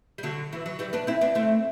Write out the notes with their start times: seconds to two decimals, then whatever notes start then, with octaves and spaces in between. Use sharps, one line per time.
0.18 G3
0.23 D3 F#3
0.53 E3
0.66 F#3
0.79 E3 G3
0.93 B3 D4
1.07 C4 E4
1.21 B3 D4
1.35 A3 C4